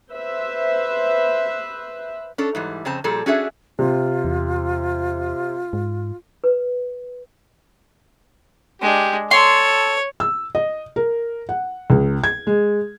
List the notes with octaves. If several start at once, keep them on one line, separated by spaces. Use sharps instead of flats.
B4 C5 E5
C#4 D4 A4
G#2 E3 G3
F2 C#3 C4 A5
A#2 F3 G3 G#4 A4
C#4 D4 F#4 G#4 A4 E5
C3 F4
E2
G#2
B4
G#3 D4 G4
A4 C#5 C6
E6
D#5
A#4
F#5
C#2
G#6
G#3